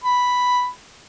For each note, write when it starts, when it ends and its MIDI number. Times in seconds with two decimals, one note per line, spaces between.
0.04 0.68 83